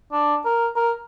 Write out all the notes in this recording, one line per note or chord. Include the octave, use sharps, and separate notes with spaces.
D4
A#4
A#4